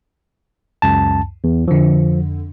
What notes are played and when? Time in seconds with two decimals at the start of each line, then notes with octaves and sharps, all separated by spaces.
0.82 C#2 F#2 A5
1.44 E2
1.68 F2 D3 F3